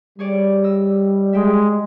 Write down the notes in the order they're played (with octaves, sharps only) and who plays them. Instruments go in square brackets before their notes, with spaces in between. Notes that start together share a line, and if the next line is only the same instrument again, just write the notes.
[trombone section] G3 [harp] G#4 C#5 D5
[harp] D#5 E6
[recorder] G#3 [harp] E5 G5